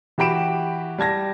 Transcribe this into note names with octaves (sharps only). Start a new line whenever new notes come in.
E3 F#4 G4 B5 D7 E7
G3 A5 G#6 A#6